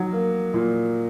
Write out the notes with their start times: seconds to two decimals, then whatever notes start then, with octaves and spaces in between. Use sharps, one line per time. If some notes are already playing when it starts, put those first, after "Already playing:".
Already playing: F#3 D#4
0.13 A#3
0.54 A#2